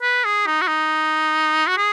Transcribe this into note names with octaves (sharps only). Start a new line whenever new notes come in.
B4
G#4
D#4
F#4
D#4
F#4
G#4